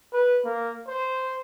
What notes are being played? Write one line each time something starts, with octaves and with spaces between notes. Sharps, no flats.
B4
A#3
C5